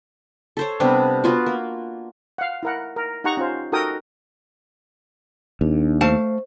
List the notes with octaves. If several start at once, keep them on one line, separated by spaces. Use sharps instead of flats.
A4 C5 C#5
C3 G3 B3 D4
B3 F4 F#4
A#3
F5 F#5
E4 A#4 F#5
A#4
D#4 G4 F#5 A#5 C#6
C#4 F4 C5
D#4 F#4 A4 A#4 G5 D#6
D#2 D4
A3 C5 F5 A5